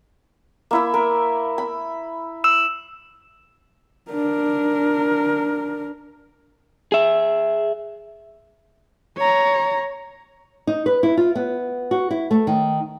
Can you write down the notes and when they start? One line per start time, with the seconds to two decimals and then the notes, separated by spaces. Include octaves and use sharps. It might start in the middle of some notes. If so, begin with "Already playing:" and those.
0.71 A#3 E4 E5
0.94 A#4
1.58 B5
2.44 E6 E7
4.12 D4 A#4
6.92 G#4 E5
9.17 C#5 A#5
10.67 D#4
10.86 B4
11.03 E4
11.17 F4
11.35 B3
11.91 F#4
12.11 E4
12.31 A3
12.47 D#3